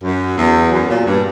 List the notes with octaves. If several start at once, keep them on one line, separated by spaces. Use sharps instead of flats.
F#2
E2
F#2
A#2
G2